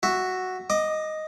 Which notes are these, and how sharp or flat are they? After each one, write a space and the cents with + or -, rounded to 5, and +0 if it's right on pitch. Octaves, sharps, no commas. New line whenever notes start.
F#4 +0 E5 +0
D#5 +0 D6 +30